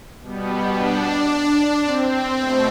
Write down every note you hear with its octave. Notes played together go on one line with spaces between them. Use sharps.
B2 G3 B3
D4
C4
B2 A3